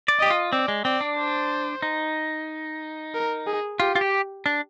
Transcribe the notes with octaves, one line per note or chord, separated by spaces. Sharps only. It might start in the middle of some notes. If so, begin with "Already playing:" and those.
D5
G4 D#5
F4
C4 D5
G#3
C4 D5
D4
C5
D#4
A#4
G#4
F4 G4
F4
G4
D4